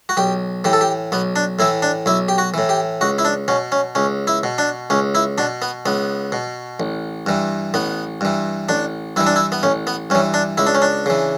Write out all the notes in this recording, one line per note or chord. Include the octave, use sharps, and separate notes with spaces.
F#4
B1 G4
A2 E3 G4
A4
G4
B1 B3
D4
A2 E3 E4
D4
B1 E4
G4
F#4
A2 E3
G4
C#2 F#4
E4
D4
B2 C#4
C#4
C#2 C#4
E4
B2
D4
C#2 C#4
E4
B2 D4
B3
C#2 B3
B2
A1
G2 E3
A1 B3
G2 E3
A1 D4
G2 E3 E4
D4
E4
B3
A1 C#4
B3
G2 E3 C#4
D4
C#2 E4
D4
C#4
D4
C#3 E3